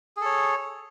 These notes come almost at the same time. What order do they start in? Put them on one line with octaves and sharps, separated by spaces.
G#4 A4 C#5